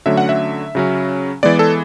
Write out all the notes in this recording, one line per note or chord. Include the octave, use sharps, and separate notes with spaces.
D3 F#3 A3 C#4 E5
F#5
E5
C#3 F#3 C#4
E3 G#3 B3 D5
A4